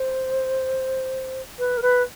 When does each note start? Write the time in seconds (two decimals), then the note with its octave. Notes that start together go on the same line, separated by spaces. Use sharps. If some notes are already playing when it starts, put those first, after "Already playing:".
Already playing: C5
1.58 B4
1.77 A#4
1.81 B4